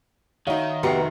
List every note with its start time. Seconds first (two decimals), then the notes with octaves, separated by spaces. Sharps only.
0.47 D#3 D#4 F#4 C#5 E5 F5
0.83 F1 B3 F#4 G4 E5 A#5 C7 C#7